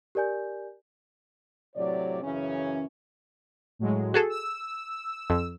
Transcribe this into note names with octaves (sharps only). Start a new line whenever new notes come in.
G4 A#4 D5 G#5 G6
A2 C3 F#3 C#5 D5
F#2 C#3 E3 C#4
A2 F#3 G#3
F#4 G#4 A4
E6
F2